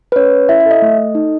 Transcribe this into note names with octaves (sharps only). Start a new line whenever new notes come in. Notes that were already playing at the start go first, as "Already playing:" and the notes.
B4
C#4 C#5
C#4
E4 E5
E5
A4
D#5
A3
A4
D#4